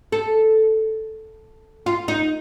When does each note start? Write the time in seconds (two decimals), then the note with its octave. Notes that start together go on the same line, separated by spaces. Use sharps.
0.12 A4
1.86 F4
2.08 D#4